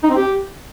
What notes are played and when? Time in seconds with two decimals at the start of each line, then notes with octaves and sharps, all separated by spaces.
0.03 D#4
0.10 C4
0.16 G4